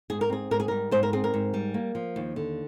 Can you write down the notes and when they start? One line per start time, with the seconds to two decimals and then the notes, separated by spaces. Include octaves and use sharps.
0.10 G#2 G#4
0.21 A#4
0.30 C4 G#4
0.51 G#2 A#4
0.60 G#4
0.68 G3 A#4
0.91 G#2 C5
1.03 A#4
1.13 C4 G#4
1.24 A#4
1.34 G#2
1.54 G3
1.74 A#3
1.95 F3
2.16 D#2
2.36 D3